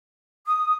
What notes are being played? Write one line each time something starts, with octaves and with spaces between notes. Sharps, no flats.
D#6